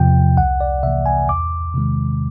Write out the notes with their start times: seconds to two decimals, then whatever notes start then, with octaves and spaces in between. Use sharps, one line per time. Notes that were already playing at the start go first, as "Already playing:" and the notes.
Already playing: E2 C3 F3 G5
0.37 C2 F#5
0.60 D5
0.83 C3 E3 A3 E5
1.06 G#5
1.29 E2 D6
1.74 C3 D#3 G#3